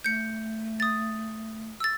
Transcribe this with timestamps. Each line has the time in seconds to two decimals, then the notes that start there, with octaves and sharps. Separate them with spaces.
0.04 A3 G6 C#7
0.80 D#6 A6
1.80 E6 A6